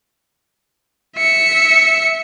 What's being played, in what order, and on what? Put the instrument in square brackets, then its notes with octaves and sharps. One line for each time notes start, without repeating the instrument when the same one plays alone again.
[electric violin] E5 C#7